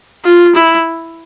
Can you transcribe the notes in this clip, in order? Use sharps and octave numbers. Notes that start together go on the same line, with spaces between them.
F4
E4